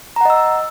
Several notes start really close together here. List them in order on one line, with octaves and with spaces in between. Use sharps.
A#5 F#5 D#5 E6